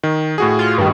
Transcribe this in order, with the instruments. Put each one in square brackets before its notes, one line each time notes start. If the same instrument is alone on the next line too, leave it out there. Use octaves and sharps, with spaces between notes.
[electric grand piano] D#3
A2 F#4 G#4
[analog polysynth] F4
G2 D#3